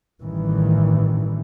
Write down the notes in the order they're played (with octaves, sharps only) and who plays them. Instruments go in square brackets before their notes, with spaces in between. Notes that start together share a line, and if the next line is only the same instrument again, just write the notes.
[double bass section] A1 G2 D#3 E3